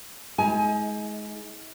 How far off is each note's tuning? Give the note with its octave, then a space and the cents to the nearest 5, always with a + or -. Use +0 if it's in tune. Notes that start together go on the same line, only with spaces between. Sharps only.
G#3 +25 D#4 +45 G#5 +20